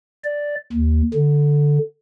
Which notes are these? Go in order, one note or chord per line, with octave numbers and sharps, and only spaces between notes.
D5
D#2
D3